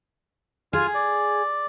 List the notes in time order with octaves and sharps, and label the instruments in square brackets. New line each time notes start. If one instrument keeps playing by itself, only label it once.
[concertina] F4 G#5 F6 [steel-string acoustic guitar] G#4
[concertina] D5